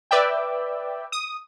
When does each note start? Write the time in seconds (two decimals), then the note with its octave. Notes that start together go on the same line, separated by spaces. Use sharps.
0.11 B4 D5 E5 G5
1.12 D#6